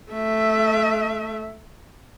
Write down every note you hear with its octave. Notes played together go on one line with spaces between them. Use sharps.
A3 E5